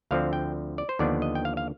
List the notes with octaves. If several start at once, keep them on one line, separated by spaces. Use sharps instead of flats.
D2 D3 F3 C4 F5
G5
D5
C5
D#2 D3 F3 B3 D4 D5
D#5
G5
F5
F5